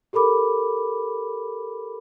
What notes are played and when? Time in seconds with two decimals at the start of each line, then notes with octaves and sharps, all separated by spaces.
0.13 G4 A4 A#4 B5 D6